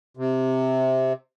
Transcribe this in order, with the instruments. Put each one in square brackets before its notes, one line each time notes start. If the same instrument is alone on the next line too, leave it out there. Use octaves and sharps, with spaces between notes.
[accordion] C3